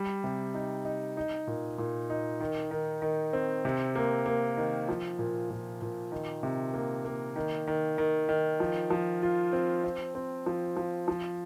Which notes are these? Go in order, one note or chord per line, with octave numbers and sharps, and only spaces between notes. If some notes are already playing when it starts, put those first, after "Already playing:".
Already playing: G3
C3
D#4
D#4
D#4
A#2
A#2
D#4
D#3
D#3
D#3
C4
C3
A#3
A#3
D#3
F3
A#2
A#2
A#2
D#3
C3
A#3
A#3
D#3
D#3
D#3
D#3
F3
F3
F4
C4
C4
C4
F3
F3
F3